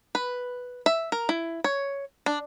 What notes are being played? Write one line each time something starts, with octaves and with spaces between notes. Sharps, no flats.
B4
E5
A#4
E4
C#5
D4